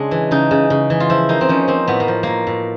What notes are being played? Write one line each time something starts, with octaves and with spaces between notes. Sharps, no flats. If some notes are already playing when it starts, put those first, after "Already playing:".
Already playing: C#3 G#3 D4
E3
C#3 D#4
C#3
C#3
E3
F4
F3 E4
A#3 D#4
C4
F3 C#4
A#3 C4
A2 B3
A#3
F3
A2 A#3
A2